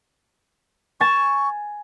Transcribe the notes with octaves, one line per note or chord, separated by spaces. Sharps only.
G#5 C#6 A6 E7